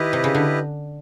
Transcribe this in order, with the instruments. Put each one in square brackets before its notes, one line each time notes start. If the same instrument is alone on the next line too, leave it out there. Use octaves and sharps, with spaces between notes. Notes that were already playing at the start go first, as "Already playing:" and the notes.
Already playing: [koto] D#3 [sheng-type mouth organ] E4 G4 B4 D#5
[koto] C3
C#3
D3